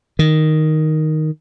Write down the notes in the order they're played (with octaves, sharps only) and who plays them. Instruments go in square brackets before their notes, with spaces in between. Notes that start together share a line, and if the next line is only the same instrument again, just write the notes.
[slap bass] D#3